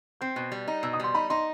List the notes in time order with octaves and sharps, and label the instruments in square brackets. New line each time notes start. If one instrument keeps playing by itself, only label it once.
[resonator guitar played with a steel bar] C4 [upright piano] G6
[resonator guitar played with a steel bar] B2 [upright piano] F#6
[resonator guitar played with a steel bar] G3
D#4
[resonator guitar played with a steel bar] B2 [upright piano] E6
[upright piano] D#6
[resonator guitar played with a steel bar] G3 [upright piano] C6
[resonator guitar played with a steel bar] D#4 [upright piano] B5
[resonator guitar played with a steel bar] D#4 [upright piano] C6